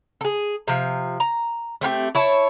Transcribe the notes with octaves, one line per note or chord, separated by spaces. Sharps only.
G#4 A4
C3 F3
A#5
A3 C4 F4 G4
E4 C#5 A5